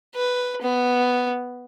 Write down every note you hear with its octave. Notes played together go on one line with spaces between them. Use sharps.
B4
B3